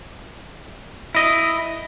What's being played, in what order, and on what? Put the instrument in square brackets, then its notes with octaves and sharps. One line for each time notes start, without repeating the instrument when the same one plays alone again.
[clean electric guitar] E4 D#5